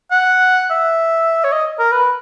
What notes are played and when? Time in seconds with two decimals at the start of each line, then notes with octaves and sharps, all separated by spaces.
0.11 F#5
0.71 E5
1.44 C#5
1.52 D#5
1.79 A#4
1.92 B4